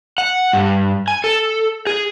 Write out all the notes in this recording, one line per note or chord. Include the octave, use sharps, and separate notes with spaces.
F#5
G2
G#5
A4
G#4